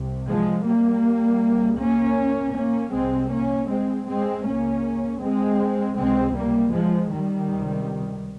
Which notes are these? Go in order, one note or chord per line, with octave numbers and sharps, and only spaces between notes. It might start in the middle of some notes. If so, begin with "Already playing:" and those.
Already playing: C2 C3
F3 G#3
G3 A#3
C#2 C#3
A#3 C#4
A#3 C#4
C2 C3 G#3 C4
A#3 C#4
G#3 C4
G#3 C4
C#2 C#3 A#3 C#4
G#3 C4
C#2 C3 G#3 C4
G3 A#3
F3 G#3
D#3 G3
C#2 C3